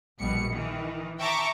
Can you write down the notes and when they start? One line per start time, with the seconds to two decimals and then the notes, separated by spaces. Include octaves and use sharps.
0.20 A#1 B2 G3 C#7
0.51 D#3 E3
1.19 E5 G5 A5 A#5 C#6 D6